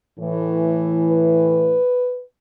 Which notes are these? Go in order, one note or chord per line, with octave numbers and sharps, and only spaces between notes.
A2 E3
B4